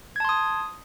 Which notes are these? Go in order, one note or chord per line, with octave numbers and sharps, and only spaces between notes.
A5 C6 D#6 G#6